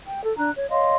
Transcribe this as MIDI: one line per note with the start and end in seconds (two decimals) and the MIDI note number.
0.08 0.21 79
0.25 0.35 69
0.38 0.50 62
0.38 0.50 82
0.38 0.50 90
0.56 0.70 73
0.70 0.97 73
0.70 0.97 75
0.70 0.97 77
0.70 0.97 84